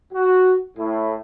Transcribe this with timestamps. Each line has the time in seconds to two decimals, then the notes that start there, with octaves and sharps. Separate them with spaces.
0.13 F#4
0.77 A2